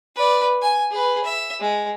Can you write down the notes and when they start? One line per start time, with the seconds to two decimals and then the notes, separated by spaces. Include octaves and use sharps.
0.16 B4 D5
0.62 G#5
0.91 G#4 B4
1.24 E5
1.61 G#3